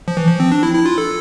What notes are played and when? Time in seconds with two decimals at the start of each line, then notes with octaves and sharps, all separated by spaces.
0.08 F3
0.17 E3
0.28 F3
0.40 C4
0.52 D4
0.63 E4
0.75 E4
0.86 F4
0.98 A4